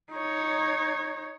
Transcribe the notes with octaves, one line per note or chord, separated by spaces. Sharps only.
D#4 C#5